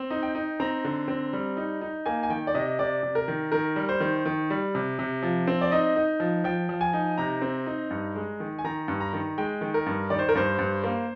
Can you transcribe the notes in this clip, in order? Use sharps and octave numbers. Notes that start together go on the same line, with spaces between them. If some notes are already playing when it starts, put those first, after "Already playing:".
Already playing: C4
D#4
G5
D#4
C4 A#5
D3
C4
G3
D#4
D#4
A#3 G#5
G#5
D#3 G5
D5
C3 D#5
C3 D5
C3
A#4
D#3
D#3 A#4
G3
C5
D#3
D#3
G3
C3
C3
F3
C4
D5
D#4 D#5
D#4
F3
F3 G5
F3
G#5
D#4
C3 A#5
C4
D#4
G2
G#3
D#3
G#5
D#3 A#5
G2
A#5
D#3
G#3 G5
D#3
A#4
G2
D#3 D5
C5
A#4
G2 C5
G2
A#3